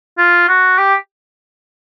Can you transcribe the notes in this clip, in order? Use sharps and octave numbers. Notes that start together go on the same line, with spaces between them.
F4
F#4
G4